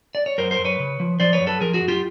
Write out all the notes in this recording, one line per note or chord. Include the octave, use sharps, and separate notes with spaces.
D5
C#5
F#2 A#4 C5
A#4 C5
F#2
B4 C#5
C#3
F3
F3 C5 D5
B4 C#5
F#2
A4 B4
F3 G#4 A#4
F#4 G#4
F#2
F4 G4